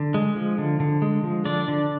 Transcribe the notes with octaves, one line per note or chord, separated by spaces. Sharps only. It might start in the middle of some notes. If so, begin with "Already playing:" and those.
Already playing: D3
G#3
F3
D3
D3
G#3
F3
D3 D4 D5
D3